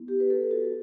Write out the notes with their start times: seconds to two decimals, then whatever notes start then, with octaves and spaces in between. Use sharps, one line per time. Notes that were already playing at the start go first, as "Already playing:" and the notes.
Already playing: B3 E4
0.08 G4
0.20 B4
0.30 A4
0.51 F#4